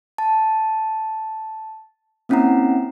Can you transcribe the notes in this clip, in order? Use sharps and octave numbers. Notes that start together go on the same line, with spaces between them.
A5
A#3 C4 C#4 E4 F#5 A#5